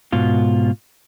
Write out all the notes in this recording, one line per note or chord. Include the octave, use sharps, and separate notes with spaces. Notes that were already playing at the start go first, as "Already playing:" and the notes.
G#2 B2 F4